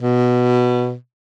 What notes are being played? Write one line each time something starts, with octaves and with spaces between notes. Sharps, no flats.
B2